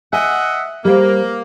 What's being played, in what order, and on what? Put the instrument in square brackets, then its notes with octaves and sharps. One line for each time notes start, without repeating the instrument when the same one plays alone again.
[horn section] D#5 E5 F#5 [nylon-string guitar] G#5
[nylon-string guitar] G3 C5 [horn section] A#3